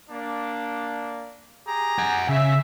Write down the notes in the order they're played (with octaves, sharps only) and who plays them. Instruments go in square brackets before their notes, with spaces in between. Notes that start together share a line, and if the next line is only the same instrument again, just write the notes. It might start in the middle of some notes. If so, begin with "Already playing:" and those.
[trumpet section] A#3 D4
G4 G#4 A#5
[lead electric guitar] F#5 G#5
[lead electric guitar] C#3 [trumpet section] E5